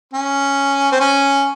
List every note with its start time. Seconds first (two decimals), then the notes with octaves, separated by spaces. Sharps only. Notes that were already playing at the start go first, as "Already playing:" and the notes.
0.14 C#4
0.92 C4
1.00 C#4